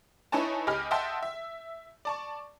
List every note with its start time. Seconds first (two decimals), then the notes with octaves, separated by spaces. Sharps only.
0.32 D#4 E4 B4 C#5 G#5 A5
0.67 C#2 G4 D#5 G#5 B5 F6
0.91 D#5 E5 F#5 G5 A5 C6
1.23 E5
2.05 D5 A5 C#6